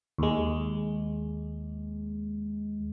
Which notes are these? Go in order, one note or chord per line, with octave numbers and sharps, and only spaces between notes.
D#2 G#3